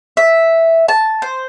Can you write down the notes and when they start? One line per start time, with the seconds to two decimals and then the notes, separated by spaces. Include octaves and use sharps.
0.17 E5
0.88 A5
1.22 C5